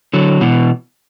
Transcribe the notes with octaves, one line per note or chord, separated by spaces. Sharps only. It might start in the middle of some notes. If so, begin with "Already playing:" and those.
D3 F#3
B2 E3